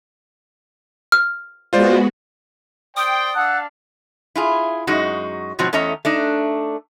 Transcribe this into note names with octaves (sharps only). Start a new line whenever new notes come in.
F6
G#3 B3 F4 F#4 C5 D5
C5 D5 G5 D#6
D4 F5 F#5 A5 E6 F#6
E4 F4 G#4
F#2 G#3 D#4 F#4
G#2 B2 F3 F#3 C4 F#4
E2 A3 C#4 D#5 A#5
A3 D4 D#4